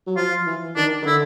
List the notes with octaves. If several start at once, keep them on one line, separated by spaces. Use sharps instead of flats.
F#3
F3 F4
E3
D#3 D4
D#3
D3 E4